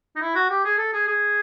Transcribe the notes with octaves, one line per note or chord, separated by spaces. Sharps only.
D#4
E4
F#4
G4
G#4
A4
G#4
G#4